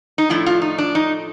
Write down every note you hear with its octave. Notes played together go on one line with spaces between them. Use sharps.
D#4
A2 F3 A3 D4 E4
F4
D#4
D4
D#4